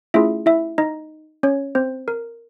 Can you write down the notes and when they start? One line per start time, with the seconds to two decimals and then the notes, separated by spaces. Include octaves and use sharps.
0.14 A3 C#4 E4 F4 G#4 E5
0.46 E4 E5
0.78 D#4 D#5
1.43 C#4 C#5
1.75 C4 C5
2.08 A#4